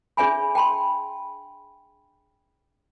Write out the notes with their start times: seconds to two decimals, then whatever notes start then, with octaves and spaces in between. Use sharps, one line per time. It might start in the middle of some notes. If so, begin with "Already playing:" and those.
0.17 D4 G#4 C#5 E5 G#5 B5
0.55 G5 A5 B5 C6